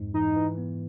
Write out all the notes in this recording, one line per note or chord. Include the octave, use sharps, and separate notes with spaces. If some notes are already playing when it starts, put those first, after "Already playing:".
Already playing: F2 G#2
E3 D#4
E3
B3